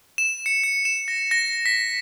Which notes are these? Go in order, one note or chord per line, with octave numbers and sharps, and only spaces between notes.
E7
C#7
C#7
E7
A#6
A#6
B6